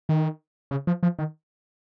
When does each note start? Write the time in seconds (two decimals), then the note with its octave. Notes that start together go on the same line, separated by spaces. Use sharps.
0.09 D#3
0.71 C#3
0.87 F3
1.03 F3
1.19 D#3